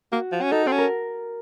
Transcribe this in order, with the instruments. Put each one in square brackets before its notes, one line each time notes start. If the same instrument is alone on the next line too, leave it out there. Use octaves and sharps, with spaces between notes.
[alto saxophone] A#3 [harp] F#4
[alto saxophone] F3
C#4
[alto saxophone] D#4 [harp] A4
[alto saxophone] C4 [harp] A4
[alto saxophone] C#4
[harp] A#4